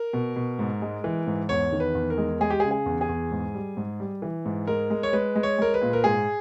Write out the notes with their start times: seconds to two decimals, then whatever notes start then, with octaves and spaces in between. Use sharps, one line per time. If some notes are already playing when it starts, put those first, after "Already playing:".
Already playing: A#4
0.13 B2
0.36 B2
0.59 G#2
0.82 G#3
1.04 E3
1.27 G#2
1.49 E2 C#5
1.72 D#3
1.80 B4
1.95 E2
2.10 A#4
2.18 G#3
2.40 G#3 G#4
2.50 G4
2.60 G#4
2.63 C#3
2.71 G#4
2.86 E2
3.01 G#4
3.09 E2
3.31 G#2
3.54 G3
3.77 G#2
4.00 G3
4.22 E3
4.45 G#2
4.67 G#3 A#4
4.90 G#3
5.03 C#5
5.13 G#3 B4
5.35 G#3
5.43 C#5
5.58 G#3 A#4
5.74 B4
5.82 A#2
5.93 A#4
6.04 G#2 G#4